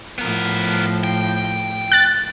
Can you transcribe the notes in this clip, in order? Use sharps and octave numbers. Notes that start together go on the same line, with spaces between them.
A2 F3 B3 A#4
G5
F#6 A6